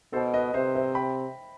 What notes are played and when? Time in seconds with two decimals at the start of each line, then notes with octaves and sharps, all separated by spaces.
0.13 B2 A4 C5
0.34 B4 D#5
0.54 C3 C5 E5
0.75 C5 E5
0.95 G5 B5